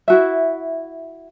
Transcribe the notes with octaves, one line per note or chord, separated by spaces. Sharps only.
E4 F#4 E5